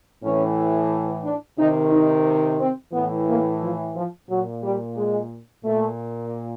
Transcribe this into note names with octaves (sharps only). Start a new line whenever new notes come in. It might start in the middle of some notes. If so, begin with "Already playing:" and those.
A2 E3 C#4
D4
C3 D#3 D#4
D#4
C4
A2 E3 B3
A#3
F3
F3
A#2 F#3
G3
G#3
A#2 A3